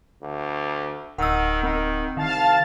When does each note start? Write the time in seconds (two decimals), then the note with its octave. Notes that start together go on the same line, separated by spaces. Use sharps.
0.22 D2
1.19 D1 D#3 F#5 E6
1.63 D#3 C4
2.17 C2 D#3 F5 A5 A6